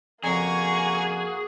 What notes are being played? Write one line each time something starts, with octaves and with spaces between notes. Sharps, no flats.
F2 C#3 A#3 F#4 G#4 G#5 A#5 C#6